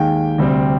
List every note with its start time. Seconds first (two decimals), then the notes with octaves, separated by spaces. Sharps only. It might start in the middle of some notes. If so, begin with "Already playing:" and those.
Already playing: D#2 D#3 G#3 G5
0.38 D2 C3 G3 C4